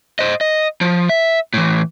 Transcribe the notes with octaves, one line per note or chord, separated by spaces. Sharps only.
C5 D#5
D#5
F3
E5
A2 E3